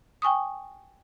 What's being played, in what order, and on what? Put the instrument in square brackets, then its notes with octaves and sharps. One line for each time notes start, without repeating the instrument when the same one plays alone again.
[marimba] G5 G#5 C#6 D#6